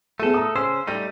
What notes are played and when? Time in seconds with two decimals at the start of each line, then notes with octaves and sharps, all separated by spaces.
0.20 A3 B3 G#4 A4 D#7
0.34 A#5 D#6
0.56 C#3 C#4 C5 E6
0.87 G3 A3 D#4 D#7